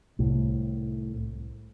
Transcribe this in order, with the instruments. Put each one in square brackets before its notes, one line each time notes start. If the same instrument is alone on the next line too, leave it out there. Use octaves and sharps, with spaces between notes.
[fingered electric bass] C2 A2